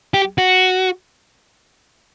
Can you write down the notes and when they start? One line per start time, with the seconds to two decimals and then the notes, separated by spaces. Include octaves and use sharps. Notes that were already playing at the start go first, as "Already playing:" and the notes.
0.14 G4
0.38 F#4